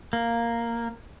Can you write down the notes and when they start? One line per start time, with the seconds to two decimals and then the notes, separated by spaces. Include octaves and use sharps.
0.13 A#3